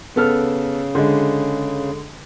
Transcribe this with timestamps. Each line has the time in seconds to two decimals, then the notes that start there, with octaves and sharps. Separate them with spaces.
0.16 C#3 B3 A4 F6
0.95 D3 G#3